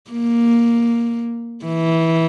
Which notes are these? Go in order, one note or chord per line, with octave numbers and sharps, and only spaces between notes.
A#3
E3